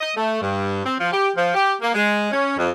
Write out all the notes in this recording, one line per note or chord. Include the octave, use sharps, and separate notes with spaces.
D#5
A3
G2
C4
F3
G4
F3
G4
A#3
G#3
C#4
F2